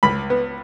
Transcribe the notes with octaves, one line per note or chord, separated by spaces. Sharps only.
C#2 B5
B3